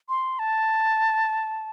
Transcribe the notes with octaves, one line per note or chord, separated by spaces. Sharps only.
C6
A5